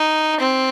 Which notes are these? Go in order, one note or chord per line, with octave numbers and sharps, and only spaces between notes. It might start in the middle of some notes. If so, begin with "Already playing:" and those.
Already playing: D#4
C4